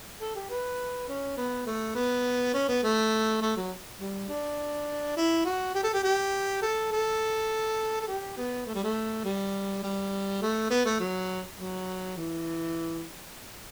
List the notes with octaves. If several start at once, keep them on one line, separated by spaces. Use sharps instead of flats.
A4
G4
B4
C#4
B3
A3
B3
C#4
B3
A3
A3
F#3
G3
D4
E4
F#4
G4
A4
G4
G4
A4
A4
A4
G4
B3
A3
G3
A3
G3
G3
A3
B3
A3
F#3
F#3
E3